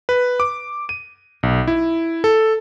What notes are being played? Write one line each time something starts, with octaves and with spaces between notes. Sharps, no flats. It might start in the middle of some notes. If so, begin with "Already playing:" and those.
B4
D6
D#7
B1
E4
A4